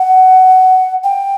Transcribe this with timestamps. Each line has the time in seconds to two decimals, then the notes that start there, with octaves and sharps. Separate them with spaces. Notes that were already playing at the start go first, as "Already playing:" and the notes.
Already playing: F#5
1.04 G5